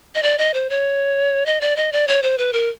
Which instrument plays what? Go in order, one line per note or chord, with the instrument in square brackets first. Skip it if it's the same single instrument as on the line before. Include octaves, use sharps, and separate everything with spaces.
[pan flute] D#5
D5
D#5
C5
C#5
D#5
D5
D#5
D5
C#5
C5
B4
A#4